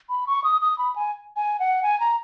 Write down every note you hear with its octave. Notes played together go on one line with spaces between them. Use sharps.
B5
C#6
D#6
D#6
B5
G#5
G#5
F#5
G#5
A#5